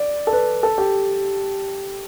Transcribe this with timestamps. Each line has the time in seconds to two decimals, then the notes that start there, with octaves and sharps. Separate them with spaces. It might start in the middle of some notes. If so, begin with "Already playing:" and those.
Already playing: D5
0.27 A4
0.33 B4
0.63 A4
0.78 G4